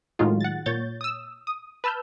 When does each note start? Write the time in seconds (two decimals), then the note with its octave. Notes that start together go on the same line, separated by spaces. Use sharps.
0.19 A2 D#3 F#3 G#3 D#4 F4
0.40 F#5 A6
0.66 A#2 C#5 G6 A6
1.01 D#6 E6
1.47 D#6
1.84 B4 A5 E6 F6 G6